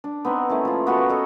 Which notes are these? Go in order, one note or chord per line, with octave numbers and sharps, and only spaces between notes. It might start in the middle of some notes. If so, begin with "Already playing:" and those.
D4
B3 C4 D#4
A3 A#3 C#4 E4
F3 F4
B3 F#4 A#4 B4
A4 C#5 D#5